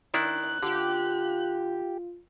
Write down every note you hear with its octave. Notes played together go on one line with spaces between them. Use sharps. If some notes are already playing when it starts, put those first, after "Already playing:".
D#3 D4 E4 F#6
D3 F4 G4